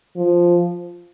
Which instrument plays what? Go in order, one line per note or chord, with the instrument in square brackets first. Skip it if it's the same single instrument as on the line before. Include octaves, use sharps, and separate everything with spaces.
[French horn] F3